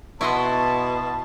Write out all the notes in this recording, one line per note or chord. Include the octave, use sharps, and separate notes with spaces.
B2 E4 D#5 F#5 A5 C6 C#6